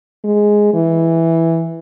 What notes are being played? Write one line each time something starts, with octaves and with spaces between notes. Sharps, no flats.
G#3
E3